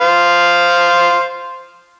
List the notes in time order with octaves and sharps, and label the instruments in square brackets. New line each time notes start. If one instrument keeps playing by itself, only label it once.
[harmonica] C5 F5